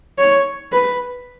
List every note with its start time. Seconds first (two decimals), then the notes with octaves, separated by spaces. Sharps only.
0.18 C#5
0.72 B4